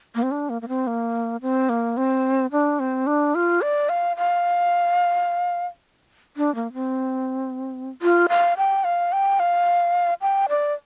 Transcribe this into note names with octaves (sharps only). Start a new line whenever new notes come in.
A#3
C4
D4
A#3
A#3
C4
A#3
C4
A#3
C4
D4
C4
D4
F4
D5
F5
F5
D4
A#3
C4
F4
F5
G5
F5
G5
F5
G5
D5